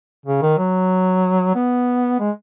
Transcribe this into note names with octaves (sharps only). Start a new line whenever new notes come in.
C#3
D#3
F#3
B3
G#3